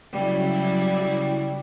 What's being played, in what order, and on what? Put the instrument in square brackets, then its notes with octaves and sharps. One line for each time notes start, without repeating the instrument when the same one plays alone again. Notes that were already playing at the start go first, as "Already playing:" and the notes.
[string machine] C#3 F#3 E4 [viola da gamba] G3